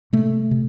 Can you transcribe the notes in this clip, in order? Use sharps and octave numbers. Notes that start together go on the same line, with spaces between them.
C3 A3
C3